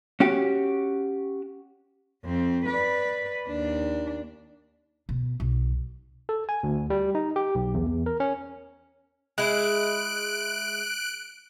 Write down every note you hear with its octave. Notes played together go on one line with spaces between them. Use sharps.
C#4 F#4 G4
F2 C4
B4 D5
D#2 D4
B2
B1
A4
G#5
D2
G3
D#4
G4
B1
E2
E2
A#4
C#4
G#3 E4 F#6 D7